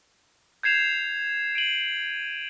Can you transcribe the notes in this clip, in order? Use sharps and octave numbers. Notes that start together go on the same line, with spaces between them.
G6 G#6 C7 E7 F7
D7 D#7 F#7